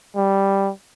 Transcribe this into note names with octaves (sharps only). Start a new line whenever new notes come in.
G3